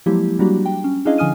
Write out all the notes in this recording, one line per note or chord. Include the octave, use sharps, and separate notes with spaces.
F3 F#3 G#3 A#3 E4 G4
F#3 G3 A#3 D4 F#4 G4
G5
C#4
C#4 D4 E4 G#4 D#5 F5
D3 F3 G#5 D#6 F6 D#7